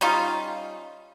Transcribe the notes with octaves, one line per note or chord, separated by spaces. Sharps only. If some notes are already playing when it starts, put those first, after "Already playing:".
G3 C#4 D#4 F4